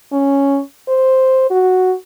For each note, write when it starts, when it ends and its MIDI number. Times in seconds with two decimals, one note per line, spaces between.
0.12 0.60 61
0.89 1.47 72
1.51 1.94 66